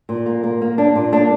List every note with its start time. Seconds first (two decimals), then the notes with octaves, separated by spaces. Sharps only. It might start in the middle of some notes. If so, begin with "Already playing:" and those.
0.09 A#2
0.26 A#3
0.43 A#3
0.62 A#3
0.78 A#3 D4
0.96 A#2
1.12 A#3 D4